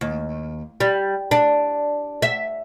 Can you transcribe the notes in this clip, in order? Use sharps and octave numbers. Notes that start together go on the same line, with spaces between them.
D#2
G3
D4
E5